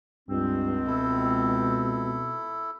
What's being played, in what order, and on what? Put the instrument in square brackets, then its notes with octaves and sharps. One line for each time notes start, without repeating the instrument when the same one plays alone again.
[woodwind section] C#2 G#3 C4 [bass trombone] G2
[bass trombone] B2 [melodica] E4 A4